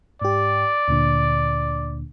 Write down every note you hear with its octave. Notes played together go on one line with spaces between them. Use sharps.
G#2 G4 D5
D2 A#2 D3